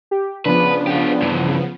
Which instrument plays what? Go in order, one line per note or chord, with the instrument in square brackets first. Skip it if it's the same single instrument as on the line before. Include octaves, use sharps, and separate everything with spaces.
[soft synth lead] G4
[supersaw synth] C#3 F3 B3 [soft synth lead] D4 [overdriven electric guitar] B4
[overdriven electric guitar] F4 G4
G2 E3